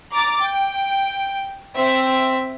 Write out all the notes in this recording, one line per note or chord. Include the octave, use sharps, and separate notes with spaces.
A#5 D6 A6
G5
C4 E5